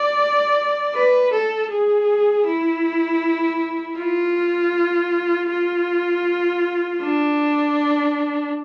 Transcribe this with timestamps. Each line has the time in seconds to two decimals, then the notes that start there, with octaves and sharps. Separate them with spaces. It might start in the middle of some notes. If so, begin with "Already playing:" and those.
Already playing: D5
0.94 B4
1.32 A4
1.70 G#4
2.46 E4
3.98 F4
5.50 F4
7.02 D4